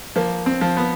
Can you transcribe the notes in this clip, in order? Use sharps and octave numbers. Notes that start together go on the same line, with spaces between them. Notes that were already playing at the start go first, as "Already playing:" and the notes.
F3 A#3
C4
F3
B3